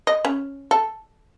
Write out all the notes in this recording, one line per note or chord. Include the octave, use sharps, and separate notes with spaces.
D#5
C#4
A4